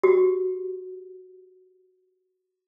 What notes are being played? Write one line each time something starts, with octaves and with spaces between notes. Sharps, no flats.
F#4 G4